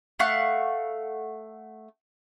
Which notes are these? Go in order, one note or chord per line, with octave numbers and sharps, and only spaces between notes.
A3 F5 F#5 C#6